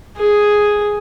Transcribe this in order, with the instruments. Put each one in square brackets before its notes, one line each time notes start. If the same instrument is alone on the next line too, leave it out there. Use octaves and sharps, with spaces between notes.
[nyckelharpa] G#4